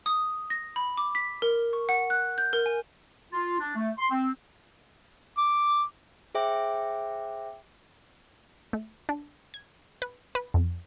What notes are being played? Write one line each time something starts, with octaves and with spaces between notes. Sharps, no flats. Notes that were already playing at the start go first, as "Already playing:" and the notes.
D#6
A#6
B5
D6
B6
A#4
C#6
F#5
F#6
G6
A#4
G#5
F4
D4
A3
C6
C4
D6
G#4 C5 E5 G5 D6
A3
D4
G#6
B4
B4
F2